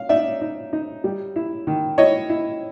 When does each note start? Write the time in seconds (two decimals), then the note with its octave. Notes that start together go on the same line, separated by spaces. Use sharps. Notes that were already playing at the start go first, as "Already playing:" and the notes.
Already playing: F5
0.09 D#4 D5 E5
0.41 D#4
0.73 D#4
1.04 G3
1.36 E4
1.67 D#3
1.98 E4 C#5 D#5
2.29 E4